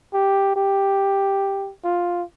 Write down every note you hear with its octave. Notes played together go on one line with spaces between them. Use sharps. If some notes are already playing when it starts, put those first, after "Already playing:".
G4
G4
F4